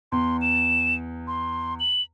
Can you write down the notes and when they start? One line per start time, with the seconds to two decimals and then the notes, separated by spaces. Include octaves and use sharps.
0.12 E2 C6
0.41 E7
1.27 C6
1.80 F#7